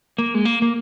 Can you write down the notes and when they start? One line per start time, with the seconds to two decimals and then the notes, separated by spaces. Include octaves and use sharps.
0.18 A#3
0.34 G#3
0.45 A#3
0.62 A#3